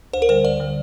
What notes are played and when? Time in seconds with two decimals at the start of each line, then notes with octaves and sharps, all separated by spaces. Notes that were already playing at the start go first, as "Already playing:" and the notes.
0.13 D2 C5
0.22 A#4
0.29 D3 G3 C5
0.44 D2 D5
0.60 D3 G3